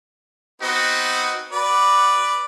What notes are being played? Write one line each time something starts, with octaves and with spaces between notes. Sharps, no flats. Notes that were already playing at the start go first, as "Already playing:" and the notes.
B3 C4 D#4 F#4
F#4 B4 D5